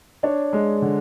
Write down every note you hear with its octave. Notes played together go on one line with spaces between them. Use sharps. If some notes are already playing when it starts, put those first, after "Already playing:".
D4 C#5
G#3
D3